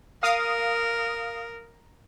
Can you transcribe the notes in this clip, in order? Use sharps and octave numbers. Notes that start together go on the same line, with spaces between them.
A#4 F5 D#6